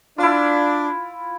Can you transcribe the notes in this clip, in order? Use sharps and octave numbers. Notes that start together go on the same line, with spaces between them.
D4 E4 F4